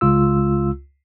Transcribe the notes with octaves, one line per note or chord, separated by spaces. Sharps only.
C#2 F4 E6